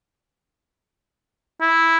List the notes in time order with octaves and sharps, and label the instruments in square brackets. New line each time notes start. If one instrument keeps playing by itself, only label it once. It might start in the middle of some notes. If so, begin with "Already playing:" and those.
[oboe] E4